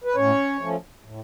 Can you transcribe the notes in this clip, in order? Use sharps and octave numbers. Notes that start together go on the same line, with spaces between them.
B4
A2 C#4 C#5
F3 A3 C#4
A2